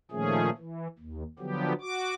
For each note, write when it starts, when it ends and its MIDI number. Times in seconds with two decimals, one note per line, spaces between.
0.11 0.50 46
0.11 0.50 51
0.11 0.50 53
0.11 0.50 57
0.11 0.50 61
0.11 0.50 68
0.57 0.87 52
0.99 1.23 39
1.39 1.73 50
1.39 1.73 53
1.39 1.73 54
1.39 1.73 59
1.39 1.73 67
1.81 2.14 66
1.81 2.14 86